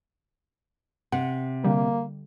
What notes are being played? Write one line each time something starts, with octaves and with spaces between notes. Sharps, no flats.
C3 F#5
D3 G3 A#3